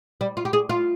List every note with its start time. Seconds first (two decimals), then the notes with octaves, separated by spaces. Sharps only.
0.21 G3
0.37 F4
0.45 G4
0.53 G#4
0.69 F4